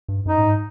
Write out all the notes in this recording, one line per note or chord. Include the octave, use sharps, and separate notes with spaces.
G2
F#2 D#4
A2
G#2